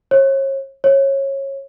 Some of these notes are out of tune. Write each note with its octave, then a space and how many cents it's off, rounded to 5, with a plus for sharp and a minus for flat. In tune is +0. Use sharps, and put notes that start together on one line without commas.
C#5 -35
C#5 -20